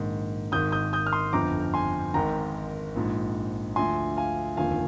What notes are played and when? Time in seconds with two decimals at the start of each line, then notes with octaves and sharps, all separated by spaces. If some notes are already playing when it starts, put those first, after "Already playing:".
Already playing: A#1 G#2 D#3
0.52 G#1 G#2 D#3 D#6 G6
0.72 D#6 G6
0.93 D#6 G6
1.07 F6
1.13 C6 D#6
1.33 G1 F2 D3 F3 A#5 D6
1.74 G#5 C6
2.14 G#1 G#2 D#3 G5 A#5
2.96 A#1 G#2 F3
3.76 D2 D3 F3 G#5 C6
4.17 F5 G#5
4.57 F1 D#2 D3 F3 F5 G#5